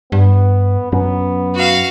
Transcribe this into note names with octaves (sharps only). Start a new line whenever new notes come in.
G2 B3
F#2 F#3 B3 C#4
F#4 F5